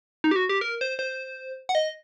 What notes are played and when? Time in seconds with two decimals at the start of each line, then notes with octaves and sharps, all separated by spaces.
0.24 D#4
0.31 G4
0.36 F#4
0.49 G4
0.61 A#4
0.81 C5
0.99 C5
1.69 F#5
1.75 D#5